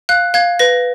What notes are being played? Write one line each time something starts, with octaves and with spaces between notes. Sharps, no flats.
F5 F#6
F5 G#6
B4 A#6